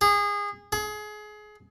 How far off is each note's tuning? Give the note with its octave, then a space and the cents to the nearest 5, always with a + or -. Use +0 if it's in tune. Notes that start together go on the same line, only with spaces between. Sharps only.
G#4 -25
G#4 +25